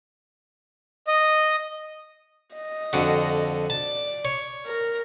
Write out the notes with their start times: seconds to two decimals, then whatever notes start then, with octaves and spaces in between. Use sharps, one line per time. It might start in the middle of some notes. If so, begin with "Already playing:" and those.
1.07 D#5
2.55 D#5
2.93 F2 D3 F#4
3.70 D5 A5
4.25 C#5
4.66 A#4